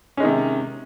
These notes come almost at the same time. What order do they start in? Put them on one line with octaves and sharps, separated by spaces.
C#4 G#3 D#3 C3